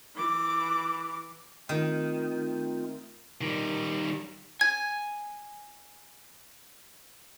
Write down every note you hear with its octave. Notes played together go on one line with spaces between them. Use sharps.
E3 D6
D#3 A3 C4 F4
D#3 G3
G#5 G#6